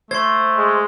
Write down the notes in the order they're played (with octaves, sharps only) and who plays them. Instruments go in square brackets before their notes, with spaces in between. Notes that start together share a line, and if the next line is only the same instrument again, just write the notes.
[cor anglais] A3 [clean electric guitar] C5 [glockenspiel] C6 G#6
[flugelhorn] G#3